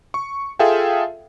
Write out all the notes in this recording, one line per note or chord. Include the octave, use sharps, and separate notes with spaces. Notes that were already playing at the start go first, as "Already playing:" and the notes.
C#6
F4 G#4 A4 E5 F5 G5